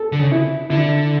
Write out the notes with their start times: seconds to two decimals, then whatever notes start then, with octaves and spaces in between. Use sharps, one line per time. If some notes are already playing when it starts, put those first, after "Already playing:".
Already playing: A4
0.12 D3
0.19 C#3
0.32 E4
0.70 D3 E4